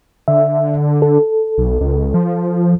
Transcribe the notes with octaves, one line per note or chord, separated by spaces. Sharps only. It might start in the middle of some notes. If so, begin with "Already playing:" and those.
D3 E5
A4
B1
C#2
F3